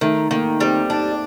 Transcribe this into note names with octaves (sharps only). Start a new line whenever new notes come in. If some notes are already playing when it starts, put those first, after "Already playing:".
D#3 A3
D#3 A#3
G3 C4
D4 D#4